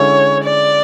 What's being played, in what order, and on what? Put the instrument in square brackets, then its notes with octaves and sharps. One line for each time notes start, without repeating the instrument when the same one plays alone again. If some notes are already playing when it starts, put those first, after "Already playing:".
Already playing: [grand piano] D3 G#3 C#4 E4 [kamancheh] C#5
[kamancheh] D5